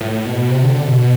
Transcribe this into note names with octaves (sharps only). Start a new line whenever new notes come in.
A2
B2
C3
D3
D3
B2
B2